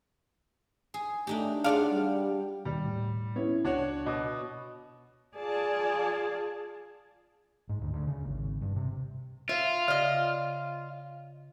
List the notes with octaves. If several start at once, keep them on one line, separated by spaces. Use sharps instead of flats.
G#4
A3 D4 D#4 G4
D4 F4 G#4 D5 F5 F#5
G3
D#2 B2 G3
A2
B3 C#4 E4 C#5
C#2 D4 F#4 C#5
B2 D#5 D6 D#6
F4 G#4 D5 A5
G#2
D2
D2
C#3
G#1
G2
C3
F4 E5
C#3 D5 D#5